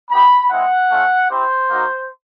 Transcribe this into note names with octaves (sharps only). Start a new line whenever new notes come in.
B3 E4 G4 B5
G#3 C4 E4 F#5
A3 C#4 F4
C4 E4 G4 C5
A#3 D#4 F#4